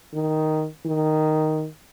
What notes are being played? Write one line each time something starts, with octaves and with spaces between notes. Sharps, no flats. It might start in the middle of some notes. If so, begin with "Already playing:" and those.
D#3
D#3